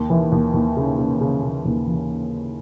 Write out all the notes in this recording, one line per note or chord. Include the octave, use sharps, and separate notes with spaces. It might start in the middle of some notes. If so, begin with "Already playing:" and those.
Already playing: D#2
E3
D#2
D#2
C#3
C#3
C#3
C#3
D#2
E3